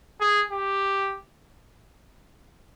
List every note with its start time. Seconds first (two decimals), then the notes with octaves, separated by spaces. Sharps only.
0.21 G#4
0.51 G4